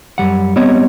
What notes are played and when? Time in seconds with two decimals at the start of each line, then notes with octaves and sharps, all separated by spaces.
0.18 F#2 G3 F#5
0.56 G3 B3 C4 C#5 D#5